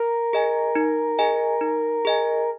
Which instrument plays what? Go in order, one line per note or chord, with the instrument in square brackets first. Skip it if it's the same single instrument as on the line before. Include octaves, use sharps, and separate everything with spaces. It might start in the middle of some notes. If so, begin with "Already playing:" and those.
Already playing: [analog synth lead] A#4
[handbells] G#4 D#5 G#5
D#4
G#4 D#5 G#5
D#4
G#4 D#5 G#5